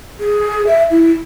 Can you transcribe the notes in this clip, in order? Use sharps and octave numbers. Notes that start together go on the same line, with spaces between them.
G#4
E5
E4